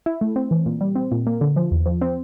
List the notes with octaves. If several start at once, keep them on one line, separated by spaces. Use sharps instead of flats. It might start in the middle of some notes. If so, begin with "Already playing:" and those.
E4
A3
C4
E3
A#2
G3
C4
A#2
A#3
D3
F3
E2
F3
C4